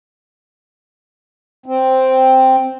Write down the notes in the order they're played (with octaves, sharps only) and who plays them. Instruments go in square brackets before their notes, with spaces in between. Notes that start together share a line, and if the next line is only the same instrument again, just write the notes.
[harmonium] C4